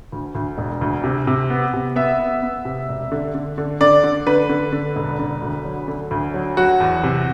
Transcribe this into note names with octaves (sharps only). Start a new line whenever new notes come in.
D2
D2
E1
D2
C3
C3
B3
C3
B3 E5
B3
B3
C3
E1
D3
D3
D3
D3 D5
D3
D3 B4
D3
D3
E1
D3
D2
F#3
D3
D2
F#3
F#3 F#4
E2
C3